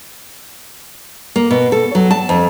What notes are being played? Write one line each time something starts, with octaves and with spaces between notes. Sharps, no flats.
A#3
B2
A4
F#3
A5
F2